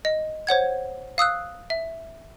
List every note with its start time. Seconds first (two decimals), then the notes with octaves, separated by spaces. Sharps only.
0.05 D#5
0.47 C5 C#5 F#5 G#6
1.18 F5 D#6 E6 F#6
1.70 E5